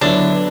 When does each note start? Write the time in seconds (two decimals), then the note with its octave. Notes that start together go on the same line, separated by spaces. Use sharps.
0.01 D3 F#3 B3 D4 E4 B4